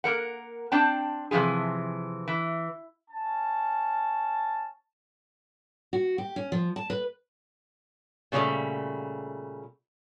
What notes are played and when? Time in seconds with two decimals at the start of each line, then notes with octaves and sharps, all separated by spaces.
0.04 A#3 A#4 F#5
0.72 C4 D4 G5 A5
1.31 C3 E3 F3 F4 G#4
2.28 E3
3.10 C#4 A5
5.93 F#4
6.18 G4
6.36 C#4
6.52 F3
6.76 A5
6.90 B4
8.32 A#2 C#3 E3 G3 A3